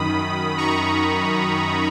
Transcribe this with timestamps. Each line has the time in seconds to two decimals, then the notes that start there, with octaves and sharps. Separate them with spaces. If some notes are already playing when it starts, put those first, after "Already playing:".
Already playing: F#2 D#3 B5 D#6
0.58 A#5 C#6